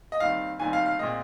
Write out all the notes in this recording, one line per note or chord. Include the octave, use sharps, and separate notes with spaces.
D#5
D#2 D#3 G3 C4 F5
D#2 D#3 G3 C4 G#5
F5
F5
A#2 G#3 C4 D#5